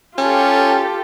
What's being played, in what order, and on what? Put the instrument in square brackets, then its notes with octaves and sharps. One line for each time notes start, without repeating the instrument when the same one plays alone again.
[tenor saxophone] C#4 [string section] F4 G4 A4